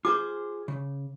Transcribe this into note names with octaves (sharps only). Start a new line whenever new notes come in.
F4 G#4 C5 D6
C#3